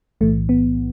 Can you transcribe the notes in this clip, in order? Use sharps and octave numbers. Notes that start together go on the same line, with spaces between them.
B1 A2 E3 A3
B3